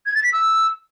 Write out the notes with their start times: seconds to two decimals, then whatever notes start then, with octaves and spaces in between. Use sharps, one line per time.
0.06 G#6
0.15 A6
0.24 B6
0.33 E6